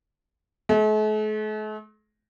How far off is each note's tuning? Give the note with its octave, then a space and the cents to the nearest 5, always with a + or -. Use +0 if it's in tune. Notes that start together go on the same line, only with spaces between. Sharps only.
A3 -45